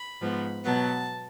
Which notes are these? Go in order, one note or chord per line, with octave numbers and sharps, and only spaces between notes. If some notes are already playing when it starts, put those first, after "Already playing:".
Already playing: B5
G#2 F3 B3
B2 F#3 B3 A5